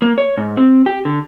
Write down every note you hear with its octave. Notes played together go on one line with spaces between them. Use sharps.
A#3
C#5
G#2
C4
G4
D3